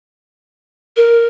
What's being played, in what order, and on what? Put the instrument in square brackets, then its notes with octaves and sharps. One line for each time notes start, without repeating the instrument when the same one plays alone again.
[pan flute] A#4